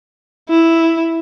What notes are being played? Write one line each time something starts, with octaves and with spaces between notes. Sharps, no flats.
E4